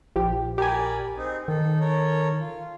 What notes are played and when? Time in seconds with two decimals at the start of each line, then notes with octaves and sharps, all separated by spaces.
0.16 A#1 F3 G4
0.58 G4 A#4 D5 G#5 B5
1.17 C4 D#4 G#4
1.48 D#3 D#4 A4
1.80 A4 A#4 C#5
2.40 F4